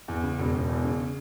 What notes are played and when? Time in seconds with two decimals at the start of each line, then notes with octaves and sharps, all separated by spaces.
0.08 E2
0.23 C#3
0.39 E1
0.54 E1
0.69 E2
0.84 C#3